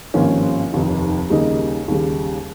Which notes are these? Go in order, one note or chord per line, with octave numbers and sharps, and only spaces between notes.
G#1 G2 F3 A#3 C#4
F1 D#2 D#3
D#2 C#3 G3 A#3 D#4
D#2 C#3 G3